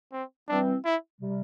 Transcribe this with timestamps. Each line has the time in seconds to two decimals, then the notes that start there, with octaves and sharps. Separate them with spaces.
0.12 C4
0.49 E3 G3 C4 D4
0.85 E4
1.21 C3 G3